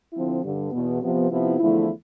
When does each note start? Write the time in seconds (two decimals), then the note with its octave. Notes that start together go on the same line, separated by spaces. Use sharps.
0.13 D3 F3 C4 E4
0.43 G2 D3 G3
0.72 E2 B2 B3
1.02 C3 F3 B3
1.31 C3 F3 B3 E4
1.60 E2 D3 F3 A3 E4